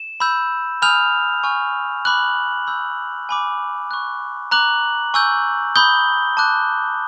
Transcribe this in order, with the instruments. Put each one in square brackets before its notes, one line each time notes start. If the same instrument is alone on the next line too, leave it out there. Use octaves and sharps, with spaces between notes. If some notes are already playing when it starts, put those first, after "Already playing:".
Already playing: [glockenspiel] E7
B5 E6 G6
G#5 B5 D#6 F6 G6 F7
G#5 C#6 F6
B5 D6 F6 F#6 F#7
B5 E6 G6
G#5 B5 D6
C#6 F#6
A#5 D6 F#6 F#7
G#5 C#6 E6 G6
B5 D#6 G6 G7
A5 D6 F#6